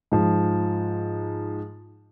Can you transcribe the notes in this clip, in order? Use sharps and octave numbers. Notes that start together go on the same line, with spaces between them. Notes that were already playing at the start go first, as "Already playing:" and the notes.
G#2 F3